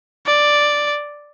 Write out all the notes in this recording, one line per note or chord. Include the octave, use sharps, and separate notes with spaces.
D5